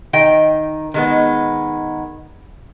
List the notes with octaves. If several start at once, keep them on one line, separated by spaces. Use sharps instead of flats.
D#3 D#5 G5
D#3 G#3 B3